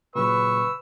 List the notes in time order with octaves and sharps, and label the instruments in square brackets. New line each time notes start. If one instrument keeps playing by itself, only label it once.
[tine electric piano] A#2 C#3 F#3 [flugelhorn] B4 [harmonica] C#6 E6